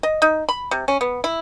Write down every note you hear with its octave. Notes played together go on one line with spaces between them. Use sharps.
D#5
D#4
B5
C3
C#4
B3
E4